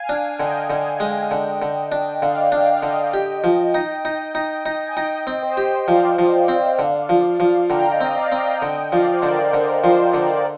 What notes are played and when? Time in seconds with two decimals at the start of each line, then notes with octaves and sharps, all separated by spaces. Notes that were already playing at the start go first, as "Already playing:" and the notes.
Already playing: F5 G#5
0.09 D4
0.40 D3 D#5 G5
0.70 D3
1.00 G#3
1.31 D3
1.62 D3
1.92 D4
2.22 D3 D5 F5
2.46 G5
2.52 D4 D5 F5
2.73 F5
2.83 D3 D#5 G5
3.14 G4
3.44 F3
3.74 D#4
4.05 D#4
4.35 D#4
4.66 D#4
4.87 G#5
4.96 D#4 D#5 G5
5.27 C4
5.43 C5 D#5
5.57 G4
5.87 F3 D5 F5
6.19 F3
6.48 C4
6.79 D3
7.09 F3
7.40 F3
7.70 D3 G5 A#5
7.93 D#5 G5
8.01 C4
8.16 D5 F5
8.32 C4
8.38 D#5 G5
8.61 D3 D#5 G5
8.92 F3 D5 F5
9.13 C5
9.22 D3 A#4 D5
9.53 D3 A#4
9.83 F3 C5
10.14 D3 A#4 D5
10.36 D5